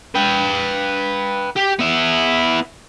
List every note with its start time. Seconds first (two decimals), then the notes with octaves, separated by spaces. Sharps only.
0.15 B4 G5
1.57 G4
1.79 B3 E4